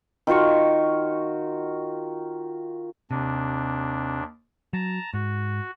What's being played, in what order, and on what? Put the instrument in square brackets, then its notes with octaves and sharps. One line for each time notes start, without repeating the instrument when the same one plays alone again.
[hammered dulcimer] D#3 F4 F#4 C#6
[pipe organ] D#2 D4 [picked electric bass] C3
[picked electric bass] F#3 [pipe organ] A5 A#5
[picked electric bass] G#2 [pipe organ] F#4